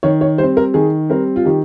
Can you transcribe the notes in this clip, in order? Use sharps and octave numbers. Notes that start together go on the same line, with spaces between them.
D#3 C#5
C#5
G3 C5
C4
A#4
D#3 G#4
G3 C4 A#4
F4
D#3 G4